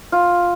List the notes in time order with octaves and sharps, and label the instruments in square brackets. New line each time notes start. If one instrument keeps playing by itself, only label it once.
[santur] F4